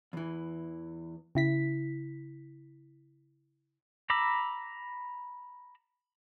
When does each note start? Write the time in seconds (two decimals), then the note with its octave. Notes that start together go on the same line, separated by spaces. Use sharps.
0.13 E2 E3
1.35 C#3 E4 B6
4.10 A#5 B5 D6 E6